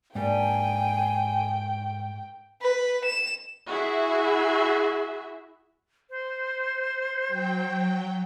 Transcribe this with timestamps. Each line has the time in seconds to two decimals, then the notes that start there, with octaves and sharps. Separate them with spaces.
0.15 G#2 G3 A#3 D4 G5 G#5
2.61 B4
3.04 E7
3.69 E4 F#4 G#4 E5
6.10 C5
7.28 F#3 G5